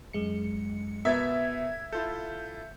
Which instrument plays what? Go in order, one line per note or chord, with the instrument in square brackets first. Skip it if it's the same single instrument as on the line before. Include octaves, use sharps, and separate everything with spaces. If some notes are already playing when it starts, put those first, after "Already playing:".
[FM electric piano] F#2 G#3 C#7
[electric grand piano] B2 B3 A6 [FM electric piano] A#4 G#6 [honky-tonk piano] E5
[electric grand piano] E4 F4 A4 [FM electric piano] G6